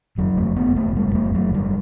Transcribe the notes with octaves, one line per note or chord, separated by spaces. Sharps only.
F#1 F#2 F#3
A3
B3
A3
G3
A3
F#3
G3